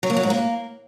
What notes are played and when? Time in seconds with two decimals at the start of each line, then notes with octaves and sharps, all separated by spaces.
0.03 F#3
0.10 A#3
0.17 F#3
0.23 G#2
0.30 A#3